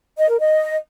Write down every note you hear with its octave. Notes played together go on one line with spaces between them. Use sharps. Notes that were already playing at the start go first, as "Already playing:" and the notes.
D#5
A#4
D#5